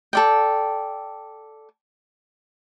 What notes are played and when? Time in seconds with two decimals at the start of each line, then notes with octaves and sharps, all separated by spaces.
0.13 A4 D5 G5